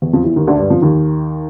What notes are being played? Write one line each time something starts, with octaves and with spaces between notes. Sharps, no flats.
E2 E3
F2 F3
E2 E3
D#2 D#3
D2 D3
G2 G3
F2 F3
D#2 D#3